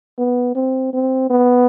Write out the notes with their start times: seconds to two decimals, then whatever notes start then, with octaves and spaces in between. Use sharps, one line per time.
0.18 B3
0.55 C4
0.93 C4
1.30 B3